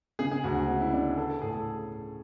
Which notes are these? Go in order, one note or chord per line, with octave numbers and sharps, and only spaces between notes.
C#3 G#4
G#4
D2 F#4
F#4
C#4 F#4
E4
C#3 D4
B3 A4
A4
A2 G#4
A4